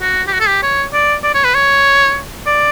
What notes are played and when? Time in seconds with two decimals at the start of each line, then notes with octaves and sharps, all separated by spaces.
0.01 F#4
0.27 G4
0.33 F#4
0.40 A4
0.48 G4
0.63 C#5
0.93 D5
1.24 D5
1.34 C#5
1.44 B4
1.54 C#5
2.46 D5